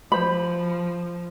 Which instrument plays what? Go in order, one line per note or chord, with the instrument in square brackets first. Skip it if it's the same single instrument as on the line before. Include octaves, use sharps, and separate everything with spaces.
[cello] F3 [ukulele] C5 B5